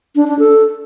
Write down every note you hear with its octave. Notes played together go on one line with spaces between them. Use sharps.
D4
D4
A4